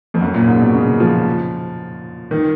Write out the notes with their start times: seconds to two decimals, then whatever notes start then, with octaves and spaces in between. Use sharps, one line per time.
0.14 F2
0.21 F#2
0.34 A#2
0.47 G#2
0.60 B2
0.74 C#3
1.00 F3
2.31 D#3